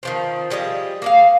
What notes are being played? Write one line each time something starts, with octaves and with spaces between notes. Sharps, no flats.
D#3 F3 C4
F3 G3 G#4 D#5
A#3 G#4 F5